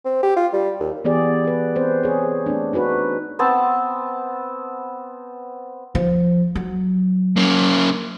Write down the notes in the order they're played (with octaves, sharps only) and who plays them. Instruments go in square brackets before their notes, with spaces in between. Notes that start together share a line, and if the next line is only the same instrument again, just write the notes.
[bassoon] C4
G4
F4
G3
D#2
[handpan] E3 B3 G4 G#4 D5
G#4 B4
C4 B4 C5
C4 G#4 C#5
A3 C4 D4
D4 D#4 F#4 B4
[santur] B3 C4 A5
[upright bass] F3
F#3
[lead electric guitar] A#3 C#4